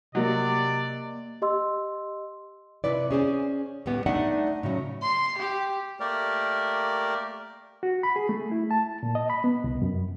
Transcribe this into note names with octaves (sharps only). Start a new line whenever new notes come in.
C3 F#3 A#3 D5 D#5
G4 D#5 C6 E6
C3 E4 B4 D5
C#4 G#4 C5 D5
A2 G3 B3
A3 D4 D#4 D5 E5 F#5
A2 C#3 F#3 C#4
C6
G4
A3 A#3 G4 A#4 D5
F#4
B5
G#4
A3
E4
A5
A#2
D#5
B5
B3
C2
F#2